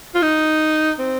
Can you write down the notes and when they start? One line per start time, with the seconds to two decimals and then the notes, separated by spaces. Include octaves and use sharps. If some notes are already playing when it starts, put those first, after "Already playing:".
0.15 F4
0.22 D#4
0.99 C4